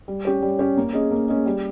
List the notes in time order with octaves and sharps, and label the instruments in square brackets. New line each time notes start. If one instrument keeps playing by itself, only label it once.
[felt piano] G3
C#4 G4 C#5
G3
C#4 G4 C#5
A#3
C#4 G#4 D#5
A#3
C#4 G#4 D#5
G3